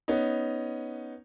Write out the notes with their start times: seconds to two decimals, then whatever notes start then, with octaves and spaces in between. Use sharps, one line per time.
0.08 B3 C#4 D#4